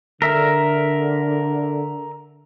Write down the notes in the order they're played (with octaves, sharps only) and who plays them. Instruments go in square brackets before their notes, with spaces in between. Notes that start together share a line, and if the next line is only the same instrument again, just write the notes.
[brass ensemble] D3 [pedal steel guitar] A#4 E5